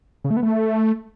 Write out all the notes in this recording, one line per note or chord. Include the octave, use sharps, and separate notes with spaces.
C#3
A3
B3
A3